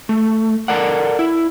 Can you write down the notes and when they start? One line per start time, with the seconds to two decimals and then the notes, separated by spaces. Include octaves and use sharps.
0.09 A3
0.68 A4 A#4 D5 F#5
1.19 E4